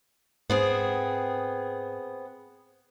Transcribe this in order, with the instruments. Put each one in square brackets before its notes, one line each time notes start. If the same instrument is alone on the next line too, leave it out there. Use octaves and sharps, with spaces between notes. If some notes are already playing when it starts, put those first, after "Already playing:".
[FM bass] G#2 [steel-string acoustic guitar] B3 C4 G#4